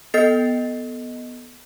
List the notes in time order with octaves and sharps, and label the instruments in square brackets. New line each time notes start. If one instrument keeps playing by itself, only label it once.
[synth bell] B3 A4 D#5 A6 C7 F7